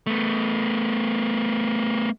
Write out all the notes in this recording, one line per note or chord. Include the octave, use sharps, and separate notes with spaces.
A3 B3